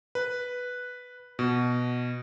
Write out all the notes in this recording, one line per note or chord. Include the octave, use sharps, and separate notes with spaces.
B4
B2